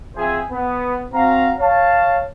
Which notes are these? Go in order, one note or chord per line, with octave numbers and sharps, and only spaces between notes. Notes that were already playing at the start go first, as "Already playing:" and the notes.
F3 C4 G#4 C5 E5 G#5
B3
C4 F#4 F5 A#5
C#5 F5 A5